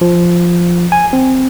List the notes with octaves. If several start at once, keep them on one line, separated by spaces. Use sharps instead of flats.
F3
G#5
C4